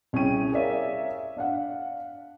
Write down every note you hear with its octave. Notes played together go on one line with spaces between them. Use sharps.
C2 C#4 E4 G#4 G5 D#7
G#4 A#4 C#5 D5 E5 F5
D4 F5 F#5